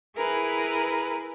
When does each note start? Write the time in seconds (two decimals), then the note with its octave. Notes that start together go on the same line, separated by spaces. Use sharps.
0.15 E4 G#4 A#4 B4